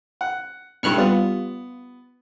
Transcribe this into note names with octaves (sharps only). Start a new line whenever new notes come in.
F#5
B1 G2 E4 C#6 F6 F#6
G3 B3 F4